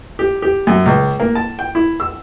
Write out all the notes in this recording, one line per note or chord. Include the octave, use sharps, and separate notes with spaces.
G4
G4
F#2
C#2
A#3
A5
G5
E4
E6